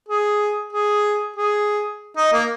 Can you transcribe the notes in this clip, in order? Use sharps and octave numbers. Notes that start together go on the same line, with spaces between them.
G#4
G#4
G#4
D#4
A#3